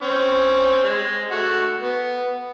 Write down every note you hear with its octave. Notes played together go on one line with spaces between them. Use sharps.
C4 C#4
G#3
A3 F#4 F#5
B3